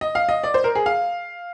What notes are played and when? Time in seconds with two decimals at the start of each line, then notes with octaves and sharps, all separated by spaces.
0.01 D#5
0.15 F5
0.29 D#5
0.44 D5
0.54 C5
0.64 A#4
0.75 G#4
0.86 F5